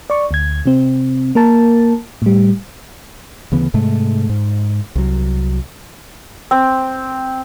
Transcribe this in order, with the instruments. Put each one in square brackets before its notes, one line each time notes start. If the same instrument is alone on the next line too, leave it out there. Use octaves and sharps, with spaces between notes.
[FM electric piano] D5 C#6
D2 G#6
C3 C4
A#3 A#4 A5
A2 G3
[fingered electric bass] D2 C#3 E3 B3
G#2 C3 G#3 A3
G#2
C2 F#3
[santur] C4